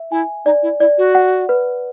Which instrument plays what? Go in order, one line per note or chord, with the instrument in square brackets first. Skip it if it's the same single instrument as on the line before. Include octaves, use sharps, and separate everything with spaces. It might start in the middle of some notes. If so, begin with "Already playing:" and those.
Already playing: [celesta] E5
[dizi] E4 [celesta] G#5
[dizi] D#4 [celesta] D5
[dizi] E4
[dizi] E4 [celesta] D5
[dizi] F#4
[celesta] F#5
B4